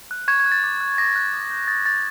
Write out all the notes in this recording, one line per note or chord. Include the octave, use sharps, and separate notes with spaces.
F#6
C#6 G#6
G#6
F#6
A6
D6
F#6
D6 A#6
F#6
D#6
G6
D#6 A6
G6 A6